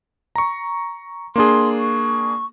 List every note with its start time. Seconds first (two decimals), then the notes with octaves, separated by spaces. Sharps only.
0.36 A#5 C#6
1.36 A#3 D4 G#4 C6
1.79 C#6